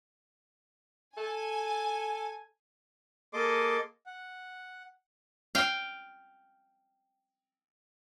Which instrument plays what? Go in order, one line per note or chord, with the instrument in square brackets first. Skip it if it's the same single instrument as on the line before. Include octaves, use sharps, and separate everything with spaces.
[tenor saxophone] A4 [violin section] G#5
[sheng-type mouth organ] A#3 G#4 A4 D#5 C6 D6
F#5
[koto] F5 G5